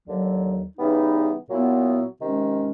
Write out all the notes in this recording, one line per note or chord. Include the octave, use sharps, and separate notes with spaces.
D#2 D3 F#3
C#3 E3 G3 B3 D#4
A#2 F#3 B3 E4
C3 D#3 G#3 C#4